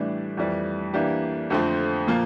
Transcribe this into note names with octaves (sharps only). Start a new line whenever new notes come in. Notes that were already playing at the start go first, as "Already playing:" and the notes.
Already playing: A2 E3 G3 D4
F2 E3 G3
E3 A#3 D4 G4
F2 D3 F3 A3 C4
A#2 F3 A#3 F4